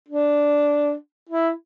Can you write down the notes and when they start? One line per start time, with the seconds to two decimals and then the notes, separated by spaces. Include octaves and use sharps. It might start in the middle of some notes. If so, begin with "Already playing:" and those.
0.09 D4
1.29 E4